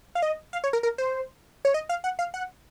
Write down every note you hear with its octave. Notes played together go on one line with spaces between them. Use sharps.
F5
D#5
F5
C#5
A#4
A#4
C5
C#5
D#5
F5
F#5
F5
F#5